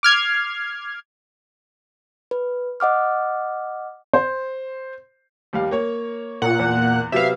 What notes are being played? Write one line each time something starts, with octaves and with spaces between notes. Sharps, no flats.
D6 F6 G#6 C7
B4
D#5 F#5 D6 F6
C5
D#2 G3 F5
A#3 C#5
A#2 F#5
E2
C3 F#3 B3 E5 F5